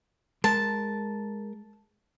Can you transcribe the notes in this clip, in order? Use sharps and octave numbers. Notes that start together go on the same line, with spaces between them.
G#3 A#4 A5